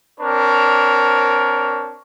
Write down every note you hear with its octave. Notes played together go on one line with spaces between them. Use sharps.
C4 D4 A#4 C#5